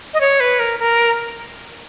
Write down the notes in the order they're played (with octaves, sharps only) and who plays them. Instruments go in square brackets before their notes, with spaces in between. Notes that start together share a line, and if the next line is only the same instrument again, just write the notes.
[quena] D#5
C#5
B4
A#4
A#4